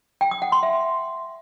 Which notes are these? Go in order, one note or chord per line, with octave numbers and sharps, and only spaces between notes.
G5
D#6
F#5
C6
E5